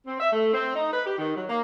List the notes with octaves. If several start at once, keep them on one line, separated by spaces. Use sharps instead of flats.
C4
E5
A3
C4
D#4
B4
G4
D#3
F#3
A#3